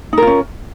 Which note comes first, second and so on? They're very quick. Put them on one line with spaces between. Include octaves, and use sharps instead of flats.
D#4 A#4 F4 C#4